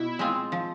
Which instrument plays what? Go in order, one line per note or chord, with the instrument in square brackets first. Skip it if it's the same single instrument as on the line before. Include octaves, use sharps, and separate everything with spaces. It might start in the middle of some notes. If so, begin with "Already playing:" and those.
Already playing: [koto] B2 [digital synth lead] E4
[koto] G#3 C4 F4
F3